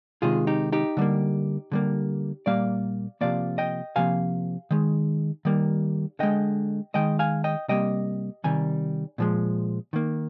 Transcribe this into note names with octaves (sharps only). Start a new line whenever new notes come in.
C3 D#3 G#3 F4 G#4
D#4 G4
D#4 G4
D3 G3 A#3
D3 G3 A#3
A#2 G3 A#3 D5 F5
C3 F3 A#3 D5 F5
D#5 G5
C3 F3 A#3 F5 G#5
D#3 G#3
D#3 G3 A#3
D3 G#3 D#5 G5
D#3 G#3 D#5 G5
F5 G#5
D#5 G5
C3 G3 A#3 D#5 G5
C3 D#3 G3 G#5
A#2 F3 G#3
D#3 A#3